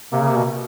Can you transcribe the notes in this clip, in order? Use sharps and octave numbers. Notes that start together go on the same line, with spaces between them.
C3 A#3
C#3
C3
B2